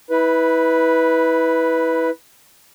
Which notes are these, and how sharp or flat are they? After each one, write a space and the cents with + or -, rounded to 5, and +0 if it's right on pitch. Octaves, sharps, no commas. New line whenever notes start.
E4 -25 B4 +0